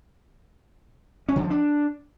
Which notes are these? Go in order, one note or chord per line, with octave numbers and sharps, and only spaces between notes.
C#4
D3
F3
D4